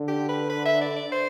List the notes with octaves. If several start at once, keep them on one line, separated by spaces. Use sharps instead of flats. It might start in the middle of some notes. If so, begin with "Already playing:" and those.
Already playing: D3
G4
B4
B4
E5
D5
D5
C5